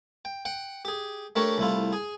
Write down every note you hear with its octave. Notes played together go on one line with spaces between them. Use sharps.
G5
F#5 G5
G4 G#4
A3 D4 G4 A#4 C#5
C2 A3 E4 F4
G#4 G#5